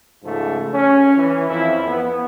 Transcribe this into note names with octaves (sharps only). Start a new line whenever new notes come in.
G#2 C#3 F3 A3
C#4
E3
F2 E4
B3